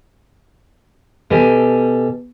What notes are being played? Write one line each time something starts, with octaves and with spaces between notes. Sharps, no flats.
B2 G4 A4 G#5